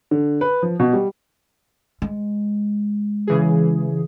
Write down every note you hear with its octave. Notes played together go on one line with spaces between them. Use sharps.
D3
B4
F3
B2
G3
G#3
C#3 E3 G#4